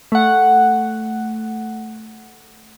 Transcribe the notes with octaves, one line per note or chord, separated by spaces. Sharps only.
A3 F#5